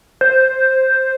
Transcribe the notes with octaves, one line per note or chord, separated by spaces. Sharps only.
C5